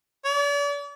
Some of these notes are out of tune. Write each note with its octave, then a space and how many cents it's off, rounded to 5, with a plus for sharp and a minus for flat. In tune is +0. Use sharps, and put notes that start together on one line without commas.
D5 -40